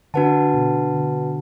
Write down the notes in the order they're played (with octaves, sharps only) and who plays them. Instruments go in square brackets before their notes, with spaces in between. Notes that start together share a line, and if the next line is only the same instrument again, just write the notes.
[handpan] D3 [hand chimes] D4 F#4 B4 F#5 A5
[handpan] B2
D3